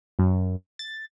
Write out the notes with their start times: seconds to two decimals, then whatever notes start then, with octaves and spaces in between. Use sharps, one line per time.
0.19 F#2
0.79 A6